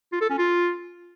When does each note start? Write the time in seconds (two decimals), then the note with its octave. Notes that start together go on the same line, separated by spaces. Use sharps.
0.13 F4
0.21 A4
0.30 C#4
0.39 F4